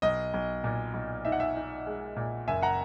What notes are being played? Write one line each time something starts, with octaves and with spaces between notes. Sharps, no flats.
B1 D#5
B1
A#2
B1
D#4 E5
F#5
E5
D#4
G#3
A#2
F#1 E5 G#5
F#5 A#5